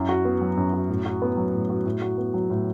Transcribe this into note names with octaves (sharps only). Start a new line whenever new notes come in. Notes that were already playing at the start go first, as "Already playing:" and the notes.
Already playing: F#2 E4
F#4
B3
F#3
F#2
F#4
A2
F#4
B3
F#3
A2
F#4
A2
F#4
B3
F#3
A2